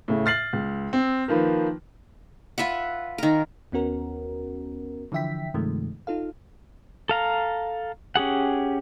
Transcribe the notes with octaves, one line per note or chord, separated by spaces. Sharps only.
A2 C#3
F6 A6 C7 F#7
C#2
C4
D#3 F3 A#3 B4
F4 B4 E5 F#5
D#3 A#4
D#2 B3 C#4 F#4 A#4
D3 E3 F3 E5 G5 B6
G2 C3 D#3 F3 G#3 A3
D#4 F4 A4 F5
A4 F5 A#5
C#4 G4 G#4 F#5